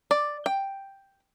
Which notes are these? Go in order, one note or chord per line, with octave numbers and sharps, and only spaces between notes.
D5
G5